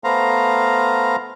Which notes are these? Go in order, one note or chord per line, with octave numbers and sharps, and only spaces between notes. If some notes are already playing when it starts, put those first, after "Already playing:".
A3 B3 C5 F5 A#5